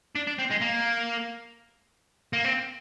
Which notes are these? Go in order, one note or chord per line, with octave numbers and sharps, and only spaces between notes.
D4
D4
C4
G#3
A#3
A#3
C4